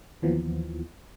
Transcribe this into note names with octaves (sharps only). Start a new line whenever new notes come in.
D#2 E3 F3 B3